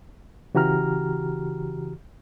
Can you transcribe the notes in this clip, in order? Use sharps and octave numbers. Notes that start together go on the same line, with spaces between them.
C#3 E3 F#4 G4 A#5 F6